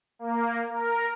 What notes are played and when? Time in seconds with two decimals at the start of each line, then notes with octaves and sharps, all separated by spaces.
0.19 A#3
0.70 A#4